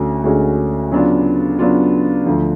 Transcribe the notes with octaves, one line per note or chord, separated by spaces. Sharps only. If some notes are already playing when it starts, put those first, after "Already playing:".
Already playing: D2 D3 C#4 F#4
D2 D3 G#3 C#4 F#4
C#3 F#3 B3 D4 F4
C#3 F#3 B3 D4 F4
D2 D3 F3